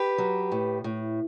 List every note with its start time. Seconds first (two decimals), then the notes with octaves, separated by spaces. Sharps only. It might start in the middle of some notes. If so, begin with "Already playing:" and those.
Already playing: G4 B4
0.18 F#3
0.52 A2
0.84 A2